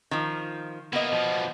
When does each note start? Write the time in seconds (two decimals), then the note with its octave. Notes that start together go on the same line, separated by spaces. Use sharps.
0.11 D#3 F3
0.93 A#3 B3 E4 D#5
1.12 B2 F3